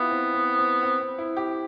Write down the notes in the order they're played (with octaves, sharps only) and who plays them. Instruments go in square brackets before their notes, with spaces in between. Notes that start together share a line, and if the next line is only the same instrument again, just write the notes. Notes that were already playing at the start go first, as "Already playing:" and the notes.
Already playing: [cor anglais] B3 [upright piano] E4 F4 G4
[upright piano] C4
C4
C4
C4
C4
E4
G4